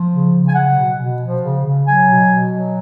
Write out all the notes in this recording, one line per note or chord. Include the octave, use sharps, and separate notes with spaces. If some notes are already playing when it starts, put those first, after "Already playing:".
Already playing: F3
C#3
C#3
G#5
F#3 F#5
B2
B2
F3
C#3
C#3
F#3 G#5
B2
B2
F#3